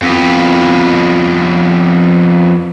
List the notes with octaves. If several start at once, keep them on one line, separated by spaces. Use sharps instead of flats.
F2 B3